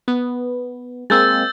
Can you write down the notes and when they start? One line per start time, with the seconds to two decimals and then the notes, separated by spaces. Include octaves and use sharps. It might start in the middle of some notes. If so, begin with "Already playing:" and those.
0.08 B3
1.10 G#3 A#3 C4 E6 G6 A6